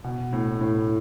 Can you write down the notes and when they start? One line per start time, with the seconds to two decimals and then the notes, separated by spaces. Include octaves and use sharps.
0.04 B2
0.33 A2
0.61 A2